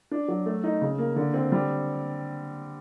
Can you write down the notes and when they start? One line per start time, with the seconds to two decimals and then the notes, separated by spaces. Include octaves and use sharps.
0.11 D4
0.28 F#3
0.46 A3
0.64 D#4
0.82 C#3
0.98 A#3
1.16 D3
1.34 C4
1.52 G3